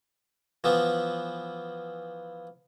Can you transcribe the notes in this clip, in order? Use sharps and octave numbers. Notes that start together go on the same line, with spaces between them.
E3 F3 B3